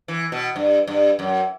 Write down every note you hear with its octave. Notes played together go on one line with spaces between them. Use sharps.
E3
B2
G2
G2
F#2